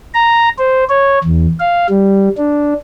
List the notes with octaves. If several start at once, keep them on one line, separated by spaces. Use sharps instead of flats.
A#5
C5
C#5
E2
F5
G3
D4